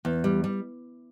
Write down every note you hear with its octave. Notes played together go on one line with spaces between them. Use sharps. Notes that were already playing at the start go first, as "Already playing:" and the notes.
E2
G3
G3